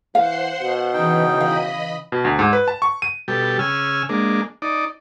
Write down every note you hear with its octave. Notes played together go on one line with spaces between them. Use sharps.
E3 C5 F5 F#5 C6
B2
C#3 E3 D#4 G5
D#5 F5 B5
B2
D2
G#2
B4
A5
C#6
D#7
B2 G3 G4 A4
C#3 G#5 E6 F6
G#3 A#3 D4
D#4 D5